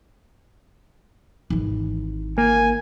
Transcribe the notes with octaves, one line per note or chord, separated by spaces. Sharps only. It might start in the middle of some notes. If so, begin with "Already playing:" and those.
G#1 E3
A#3 G#5